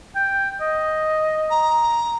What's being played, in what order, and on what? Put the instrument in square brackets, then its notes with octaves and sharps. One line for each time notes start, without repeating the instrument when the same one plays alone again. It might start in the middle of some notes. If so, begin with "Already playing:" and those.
[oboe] G5
D#5
[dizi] A#5